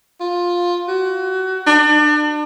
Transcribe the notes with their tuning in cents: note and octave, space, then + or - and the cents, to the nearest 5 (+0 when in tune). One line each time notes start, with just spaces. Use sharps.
F4 +10
F#4 +25
D4 +35